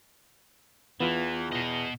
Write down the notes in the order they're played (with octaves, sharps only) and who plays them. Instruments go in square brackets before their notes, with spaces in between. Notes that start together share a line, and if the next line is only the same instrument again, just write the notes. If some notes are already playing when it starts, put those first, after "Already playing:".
[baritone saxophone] E2 [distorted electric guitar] E3 [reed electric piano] B3 F4
[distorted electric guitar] B2 D#5